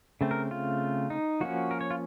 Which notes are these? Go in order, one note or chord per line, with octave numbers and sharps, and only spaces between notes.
C#3 A3 C4
A#4
F4
D#4
F3 A#3 C#4 F#4
A#4
C#5
F4